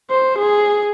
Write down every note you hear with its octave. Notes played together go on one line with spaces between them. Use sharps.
C5
G#4